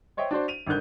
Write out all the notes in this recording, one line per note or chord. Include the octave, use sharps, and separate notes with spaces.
C5 C#5 D#5 E5 G5
D4 F#4 C5 D5
D#7 F7
G#1 G2 D3 A#4 F#6 G6